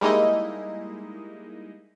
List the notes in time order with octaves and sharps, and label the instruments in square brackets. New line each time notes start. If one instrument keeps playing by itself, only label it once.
[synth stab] G3 G#3 A#3 D#4 E4 D#5